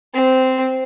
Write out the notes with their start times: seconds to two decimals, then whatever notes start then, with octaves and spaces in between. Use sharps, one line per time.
0.14 C4